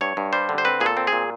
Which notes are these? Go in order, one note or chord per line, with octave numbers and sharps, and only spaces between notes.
G2 C#5
G2
G3 C5
D3
C5
C4 B4
A#2 G#4
A4
C4
G#4
A#2